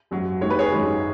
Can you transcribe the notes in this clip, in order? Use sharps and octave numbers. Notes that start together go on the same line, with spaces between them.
G#1 F#2 F#3
D#2 D#3 G#3 C#5
B4
G#4 C#5
G#1 F#2 D#3 G#3